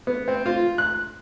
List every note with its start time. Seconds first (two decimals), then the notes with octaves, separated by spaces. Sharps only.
0.07 B3
0.28 C4
0.46 F4
0.78 F#6